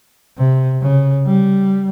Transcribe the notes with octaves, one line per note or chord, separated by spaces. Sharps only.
C3
C#3
G3